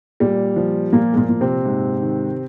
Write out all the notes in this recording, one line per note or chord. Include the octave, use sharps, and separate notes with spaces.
A#2 G3
F3
A#2 F3 A#3
G#3
A#2 A#3
A#2
C3 C4
G#2
D#3